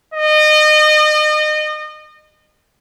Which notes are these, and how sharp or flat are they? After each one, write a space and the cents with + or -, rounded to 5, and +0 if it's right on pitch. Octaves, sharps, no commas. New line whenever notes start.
D#5 -30